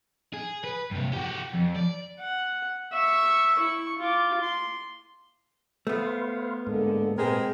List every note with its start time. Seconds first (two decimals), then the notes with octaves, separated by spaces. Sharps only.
0.34 G#4
0.64 B4
0.91 G2 C3
1.13 F#4 G4
1.54 F2
1.76 D5
2.20 F#5
2.93 E5 C#6
3.55 E4 C#6
3.99 F4 D6
4.43 C6
5.87 A3 B3 B4 C5 F5
6.67 G#2 D3 G#3 A#3 A4
7.18 A#2 G#3 C4 G4 A#4 B4 G#5